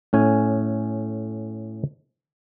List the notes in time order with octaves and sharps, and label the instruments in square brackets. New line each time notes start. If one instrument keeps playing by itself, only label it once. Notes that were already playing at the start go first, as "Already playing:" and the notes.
[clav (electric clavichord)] A2 C#4 G#5